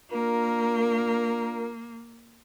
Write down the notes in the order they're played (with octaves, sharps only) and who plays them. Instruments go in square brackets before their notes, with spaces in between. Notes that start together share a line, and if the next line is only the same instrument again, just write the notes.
[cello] A#3 [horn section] D4 F4 A#4